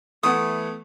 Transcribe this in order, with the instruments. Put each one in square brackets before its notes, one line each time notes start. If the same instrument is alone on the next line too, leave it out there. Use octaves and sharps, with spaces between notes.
[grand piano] E3 B3 [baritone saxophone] A3 [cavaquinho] D#6